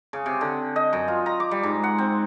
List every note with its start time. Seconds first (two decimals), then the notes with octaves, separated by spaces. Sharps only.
0.13 C#3
0.26 C3
0.41 D3
0.76 D#5
0.93 F#2
1.08 F4
1.26 A#5
1.40 D6
1.51 G3
1.63 G#2
1.84 F#5
1.98 C4